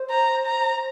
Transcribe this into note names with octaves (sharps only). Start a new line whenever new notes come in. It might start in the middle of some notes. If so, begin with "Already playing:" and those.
Already playing: C5
A#5
A#5